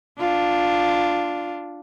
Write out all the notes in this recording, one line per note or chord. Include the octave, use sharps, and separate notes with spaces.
D4 F4